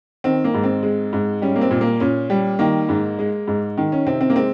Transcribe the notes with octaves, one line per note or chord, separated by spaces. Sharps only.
D#3 C4
A#3
G#2
C4
G#3
G#2
G3 C#4
A#3
C4
A#2
A#3
A#2 C#4
G3
D#3 A#3
G#2
G#3
G#2
D#3
C#4
C3 C4
C4
A#3
G#3 C4